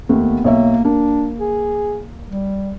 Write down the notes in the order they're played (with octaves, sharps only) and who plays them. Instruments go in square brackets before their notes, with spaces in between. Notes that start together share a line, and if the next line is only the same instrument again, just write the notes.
[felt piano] D#2 A3 [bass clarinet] B3
[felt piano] B1 C#5 E5 [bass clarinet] A#3
[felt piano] A#3 [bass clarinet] D4
[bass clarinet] G#4
G3